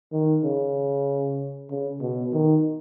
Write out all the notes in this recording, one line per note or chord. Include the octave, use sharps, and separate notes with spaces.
D#3
C#3
C#3
B2
D#3